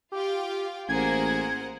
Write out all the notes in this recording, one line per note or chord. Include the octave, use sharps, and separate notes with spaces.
F4 G4 F5 G5
A1 A#3 G#4 A#4 C5 F#5 G#6